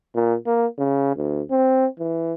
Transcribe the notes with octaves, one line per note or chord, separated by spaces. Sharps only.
A#2
A#3
C#3
D2
C4
E3